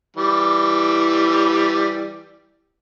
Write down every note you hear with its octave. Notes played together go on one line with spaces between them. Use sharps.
E3 G3